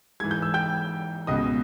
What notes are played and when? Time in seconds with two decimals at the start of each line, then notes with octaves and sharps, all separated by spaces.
0.20 G#2 E3 G#6
0.31 G6
0.42 E6
0.54 G5 G6
1.27 C#2 B2 D#5 D#6